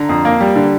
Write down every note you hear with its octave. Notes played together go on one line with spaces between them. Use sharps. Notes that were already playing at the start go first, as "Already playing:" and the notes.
Already playing: D3 A#5
F2
A#3
G3
D3